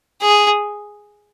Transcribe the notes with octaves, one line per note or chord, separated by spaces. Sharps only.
G#4